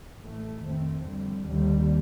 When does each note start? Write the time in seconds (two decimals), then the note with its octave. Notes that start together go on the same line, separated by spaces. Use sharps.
0.23 A1 A2 A3
0.64 F2 D#3 A3 C4
1.06 F2 D3 G3
1.48 D#2 D3 G3